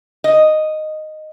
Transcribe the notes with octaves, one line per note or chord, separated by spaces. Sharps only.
D#5